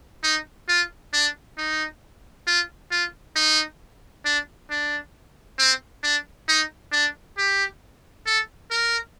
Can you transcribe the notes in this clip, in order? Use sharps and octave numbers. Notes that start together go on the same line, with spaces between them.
D#4
F4
D4
D#4
F4
F4
D#4
D4
D4
C4
D4
D#4
D4
G4
A4
A#4